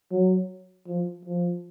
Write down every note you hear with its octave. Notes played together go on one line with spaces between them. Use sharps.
F#3
F3
F3